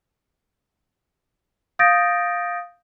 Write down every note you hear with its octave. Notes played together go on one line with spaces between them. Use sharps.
F5 D#6 G6 A6 A#6 D7